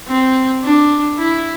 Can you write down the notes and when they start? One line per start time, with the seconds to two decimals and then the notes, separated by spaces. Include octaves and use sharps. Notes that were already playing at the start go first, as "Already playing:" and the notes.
0.09 C4
0.63 D4
1.18 E4